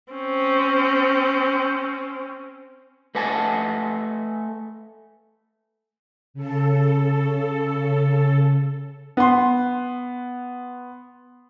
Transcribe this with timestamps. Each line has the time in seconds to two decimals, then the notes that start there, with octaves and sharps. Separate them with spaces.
0.13 C4 C#4
3.15 A3 B4 D#5 F#5 G#5 A5
6.34 C#3 A4
9.17 B3 C6